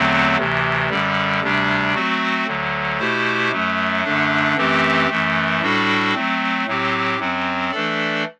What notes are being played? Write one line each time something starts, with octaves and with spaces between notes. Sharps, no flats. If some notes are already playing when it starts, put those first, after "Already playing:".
Already playing: E2 D3 F#3 A3 C4
D2 C3 E3
F#2 D3 G3
D2 C3 G3 D4
F#3 A3 C4 F#4
D2 D3 F#3
B2 A3 E4 G4 C5
F#2 F#3 A3
F#2 D3 A3 D4
F#2 E3 A3 C4 G4
F#2 E3 A3
A2 G3 D4 F#4 A4
F#3 A3 C4
A2 F#3 C4 G4
F#2 F#3 C4
E3 A3 D4 A4 D5